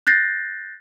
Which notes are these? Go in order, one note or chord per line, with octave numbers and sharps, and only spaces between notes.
F#6 G6 A6 A#6 C7